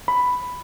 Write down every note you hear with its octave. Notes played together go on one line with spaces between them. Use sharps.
B5